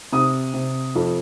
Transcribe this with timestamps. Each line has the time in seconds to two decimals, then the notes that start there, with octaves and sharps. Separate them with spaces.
0.12 C3 D#6
0.54 C3
0.95 F2